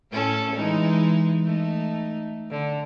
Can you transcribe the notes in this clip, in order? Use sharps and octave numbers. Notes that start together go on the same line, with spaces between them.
A2 C#4 A4
E3 G#3 D#4
A3 D#4
D3